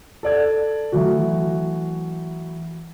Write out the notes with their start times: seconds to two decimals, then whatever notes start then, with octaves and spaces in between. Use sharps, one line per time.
0.23 A4 D5 G#6
0.92 E3 F#3 A3 F#4